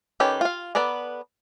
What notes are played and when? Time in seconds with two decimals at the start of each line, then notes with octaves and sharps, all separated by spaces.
0.20 D#3 C#4 G4 A4 B4
0.41 F4 F5
0.75 B3 A4 B4 D5 A#5